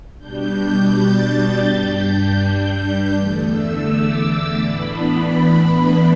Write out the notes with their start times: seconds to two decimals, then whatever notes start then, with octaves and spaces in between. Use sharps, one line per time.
0.19 B2 G3 D4 G6
0.92 A6
1.66 G2 G3 D4 G6
2.02 G6
3.13 E2 D3 A3
3.49 E6
3.87 D6
4.59 A2 E3 B3 D4 B5